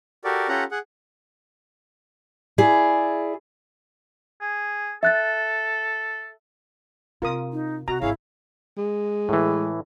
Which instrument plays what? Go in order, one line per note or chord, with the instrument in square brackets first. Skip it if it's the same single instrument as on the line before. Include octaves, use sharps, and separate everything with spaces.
[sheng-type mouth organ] F#4 G4 A4 A#4 D5
C#4 F4 G4 A4 F#5 A#5
G#4 F#5
[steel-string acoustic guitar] E4 G#4 D5
[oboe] G#4
[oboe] A4 [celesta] E5 F#6 A6
[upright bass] C3 [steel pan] F4 A#4 D#6
[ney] D#4
[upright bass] C3 [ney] F#4 [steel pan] A#5
[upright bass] G#1 F4 [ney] E4 [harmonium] G#4 C#5 F5
[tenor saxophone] G#3
[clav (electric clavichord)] A2 E3